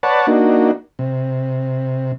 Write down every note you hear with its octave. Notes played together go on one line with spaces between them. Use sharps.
B4 C#5 D5 F#5 A5
A#3 D4 D#4 F#4
C3